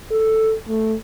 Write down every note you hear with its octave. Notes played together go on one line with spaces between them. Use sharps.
A4
A3